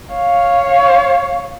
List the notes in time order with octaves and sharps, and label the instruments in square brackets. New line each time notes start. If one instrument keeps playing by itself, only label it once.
[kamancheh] C#5 F5